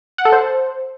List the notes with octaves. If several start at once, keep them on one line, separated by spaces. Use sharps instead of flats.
F#5
A4
C5